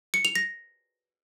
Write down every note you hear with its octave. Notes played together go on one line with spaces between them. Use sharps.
C#7
F7
A#6